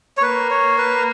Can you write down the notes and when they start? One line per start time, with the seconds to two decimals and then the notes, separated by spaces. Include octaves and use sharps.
0.17 C#5
0.22 A#3 B4
0.50 C#5
0.78 B4